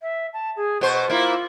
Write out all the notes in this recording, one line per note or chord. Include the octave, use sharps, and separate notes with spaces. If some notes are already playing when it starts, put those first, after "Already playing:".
E5
A5
G#4
B2 C5 C#6
A#3 E4 F4